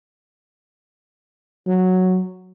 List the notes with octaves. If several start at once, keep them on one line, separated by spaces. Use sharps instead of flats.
F#3